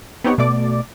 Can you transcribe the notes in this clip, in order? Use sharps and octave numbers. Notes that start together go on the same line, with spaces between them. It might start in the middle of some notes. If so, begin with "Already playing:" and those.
B3 C4 D#4 G4 C#5 F#5
B2 A3 D5 D6